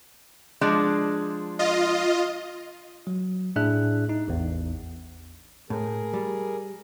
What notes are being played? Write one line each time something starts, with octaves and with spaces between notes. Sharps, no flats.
F3 G#3 D4
F4 D#5
F#3
A2 D4 G#4 E5 F#6
D#4
A1 E2
A2 G#4 A#4
G3